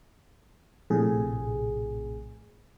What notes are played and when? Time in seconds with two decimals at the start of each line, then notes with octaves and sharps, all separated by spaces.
0.90 A#1 A2 C3 G#4